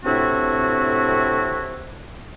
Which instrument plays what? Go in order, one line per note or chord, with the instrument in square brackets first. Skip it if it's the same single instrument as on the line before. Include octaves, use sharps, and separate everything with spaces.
[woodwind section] A2 C3 C4 D4 E4 F#4